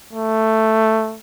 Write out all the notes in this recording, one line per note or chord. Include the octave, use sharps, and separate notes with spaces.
A3